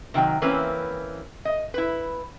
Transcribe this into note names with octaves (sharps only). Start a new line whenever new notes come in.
C3 D#3 F#3 G5
E3 A#3 C4 C#4 B4
D#5
E4 B4